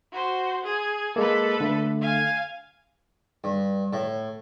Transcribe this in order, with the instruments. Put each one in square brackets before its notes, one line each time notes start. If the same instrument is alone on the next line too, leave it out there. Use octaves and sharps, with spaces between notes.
[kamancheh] F#4 C5
G#4
[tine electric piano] G#3 A#3 [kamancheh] A4 B4
[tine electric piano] D3 A3
[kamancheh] F5 G#5
[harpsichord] G2
A2